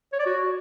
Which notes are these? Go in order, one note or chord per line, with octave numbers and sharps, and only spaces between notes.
C#5
D5
F#4